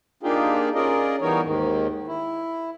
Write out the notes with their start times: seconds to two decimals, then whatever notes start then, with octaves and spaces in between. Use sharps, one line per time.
0.23 A#3 D4 D#4 F4 G4 G#4
0.75 C#4 F4 G#4 A#4 D5 D#5
1.21 E3 G3 B3 D#4 A#4 C#5
1.42 D#2 G#2 D#3
2.08 E4